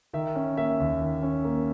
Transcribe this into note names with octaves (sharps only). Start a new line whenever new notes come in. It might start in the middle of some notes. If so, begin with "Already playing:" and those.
D#3 E5
C#4
A#3 E5
D#2
D#3
C#4
A#3